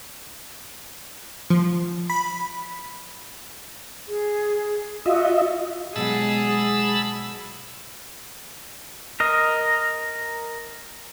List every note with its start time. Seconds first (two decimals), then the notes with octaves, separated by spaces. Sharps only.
1.50 F3
2.10 B5
4.08 G#4
5.06 F4 F#4 D#5 E5
5.96 B2 F#3 G#3 G#4 F#5 A5 B5 E6
9.20 A#4 D#5